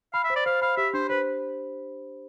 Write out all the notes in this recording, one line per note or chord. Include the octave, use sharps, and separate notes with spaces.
F5 B5
E5
C5
D5
C5 F5
F5 B5
G4 E5
D4 C5
B4 C5